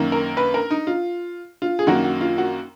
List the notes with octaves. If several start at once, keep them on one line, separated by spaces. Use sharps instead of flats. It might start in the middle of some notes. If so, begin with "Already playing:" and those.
Already playing: F#2 D#3 A#3
A#4
B4
A#4
D#4
F4
F4
G#4
F#2 D#3 A#3 F#4
F#4
F4
F#4